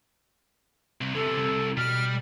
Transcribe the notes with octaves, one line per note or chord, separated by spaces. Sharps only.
C2
C3 E3 A4
C2
B2 G3 F6